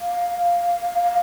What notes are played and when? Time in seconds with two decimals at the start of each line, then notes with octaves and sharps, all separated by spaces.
0.01 F5